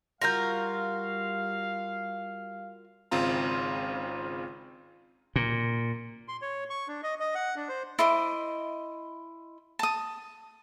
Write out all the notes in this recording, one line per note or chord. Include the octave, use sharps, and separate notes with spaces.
G3 F4 F#4 A#4 F5 G6 A#6
G#1 C#3 C4 F4 A#5
A#2
C6
C#5
C#6
D4
D#5
D#5
F#5
D4
C5
E4 C5 D#5 D6
A5 D#6